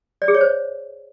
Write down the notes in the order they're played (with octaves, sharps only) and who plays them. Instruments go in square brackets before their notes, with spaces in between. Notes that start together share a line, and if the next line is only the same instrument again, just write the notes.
[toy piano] D5
G#4
C#5
C5